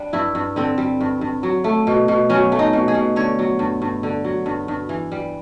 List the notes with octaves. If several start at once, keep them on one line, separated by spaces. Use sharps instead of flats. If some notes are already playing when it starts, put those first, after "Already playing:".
Already playing: G3 D4
G2 E4
G2
D3 C4
G3
G2
G2
F#3
A3
B2
B2
F#3 C#4
A3
D#4
B2
G#4
B2
D3 C#5
F#3
G2
G2
D3
F#3
G2
G2
E3
G3